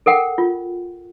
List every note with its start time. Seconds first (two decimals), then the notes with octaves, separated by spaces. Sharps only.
0.06 A4 A#4 F#5 G5
0.38 F4